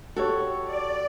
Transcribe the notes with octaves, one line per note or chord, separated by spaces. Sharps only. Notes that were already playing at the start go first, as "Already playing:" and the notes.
F#4 G4 A4 C#5
D5